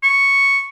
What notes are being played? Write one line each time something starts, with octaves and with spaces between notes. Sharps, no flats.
C#6